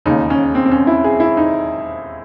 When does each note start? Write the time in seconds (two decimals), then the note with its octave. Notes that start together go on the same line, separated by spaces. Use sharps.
0.06 E1 D#2 C#3 D#4
0.30 C#4
0.55 C4
0.66 C4
0.71 C#4
0.87 E4
1.04 G#4
1.20 E4
1.37 D#4